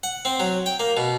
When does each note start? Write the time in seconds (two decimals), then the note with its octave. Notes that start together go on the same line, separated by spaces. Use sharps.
0.03 F#5
0.25 C4
0.40 F#3
0.66 G5
0.80 A#3
0.97 B2